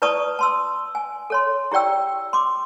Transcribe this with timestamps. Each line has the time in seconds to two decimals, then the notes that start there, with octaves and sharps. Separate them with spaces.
0.02 E4 B4 D5 A5 C#6 D#6
0.39 A5 C6 E6
0.95 G#5
1.30 A4 C#5 C6
1.72 E4 G4 D5 G5 E6
2.33 C6 D6